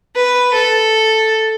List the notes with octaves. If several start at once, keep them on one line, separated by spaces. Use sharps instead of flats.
B4
A4